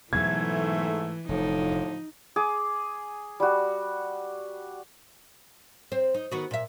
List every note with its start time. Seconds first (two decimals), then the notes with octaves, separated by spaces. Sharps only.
0.13 G#2 B2 E3 F#3 A3 G#6
1.29 F1 A2 D3 F3 D#4
2.36 G#4 D6
3.40 G3 F#4
5.92 C4 C5
6.14 D#4
6.32 D#3 B3 F#4
6.51 A#2 E5